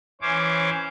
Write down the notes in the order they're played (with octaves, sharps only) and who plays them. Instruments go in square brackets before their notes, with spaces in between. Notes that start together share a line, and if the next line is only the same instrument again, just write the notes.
[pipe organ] E3 C#4 C5 C#5 D6